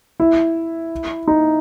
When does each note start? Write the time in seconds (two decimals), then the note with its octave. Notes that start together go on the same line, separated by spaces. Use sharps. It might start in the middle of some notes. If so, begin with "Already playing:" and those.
0.20 E4
1.28 D#4